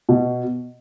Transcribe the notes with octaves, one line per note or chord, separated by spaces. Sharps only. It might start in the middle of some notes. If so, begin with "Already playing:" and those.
B2